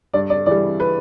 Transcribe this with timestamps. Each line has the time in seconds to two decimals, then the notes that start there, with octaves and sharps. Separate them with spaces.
0.14 G2 D5
0.30 D5
0.46 E3 G3 D5
0.80 B4